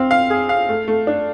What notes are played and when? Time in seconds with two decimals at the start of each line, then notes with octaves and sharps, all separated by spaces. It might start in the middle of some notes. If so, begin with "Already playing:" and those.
Already playing: C4 F5
0.11 F5
0.30 G#4
0.49 F5
0.69 A3
0.88 A3
1.07 D4